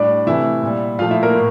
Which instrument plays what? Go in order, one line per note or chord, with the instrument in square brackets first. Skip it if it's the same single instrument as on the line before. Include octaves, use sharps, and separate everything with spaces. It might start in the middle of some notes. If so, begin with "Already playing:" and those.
Already playing: [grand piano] A2 G3 D4 D5
C3 E3 A3 E4 E5
A#2 G3
A#2 F3 A3 F4 F5
E4 E5
A#3 A#4
A2